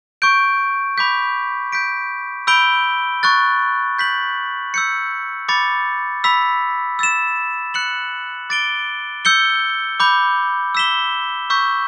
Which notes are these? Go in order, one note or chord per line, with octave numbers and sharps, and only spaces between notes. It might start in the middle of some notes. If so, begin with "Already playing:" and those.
C#6 G6 D7
B5 D6 G6 B6
G6 B6 D7
B5 E6 G6 D7 G7
C#6 F#6 A6
G6 B6 F#7
E6 G6 C#7
B5 D6 A6 C#7
B5 E6 B6
E6 A6 E7
F#6 C#7 F#7
D6 A6 D7 G7
E6 G6 C#7 G7
B5 D6 G6
E6 B6 E7 G7
C#6 E6 G6 B6